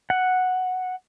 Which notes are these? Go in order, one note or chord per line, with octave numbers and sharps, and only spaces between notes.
F#5